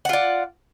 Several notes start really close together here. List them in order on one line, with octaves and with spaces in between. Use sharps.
F#5 F4 D5